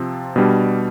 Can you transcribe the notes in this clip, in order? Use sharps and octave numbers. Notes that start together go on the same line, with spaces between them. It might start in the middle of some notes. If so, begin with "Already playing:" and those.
Already playing: C3 F3 C4
B2 G3 D4